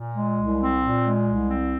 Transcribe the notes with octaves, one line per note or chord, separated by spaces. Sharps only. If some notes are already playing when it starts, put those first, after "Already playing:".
Already playing: A#2
G#3
C2
C4
A#2
G#3
C2
C4